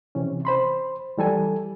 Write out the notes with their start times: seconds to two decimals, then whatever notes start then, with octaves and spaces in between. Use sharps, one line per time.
0.15 C3 E3 C#4
0.45 C5 B5 C6
1.18 E3 G3 A4 G#5